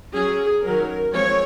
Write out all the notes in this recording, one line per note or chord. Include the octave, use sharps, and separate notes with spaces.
F#3 C#4 G#4
D#3 F#3 C#4 A#4
F3 G#3 C4 C#5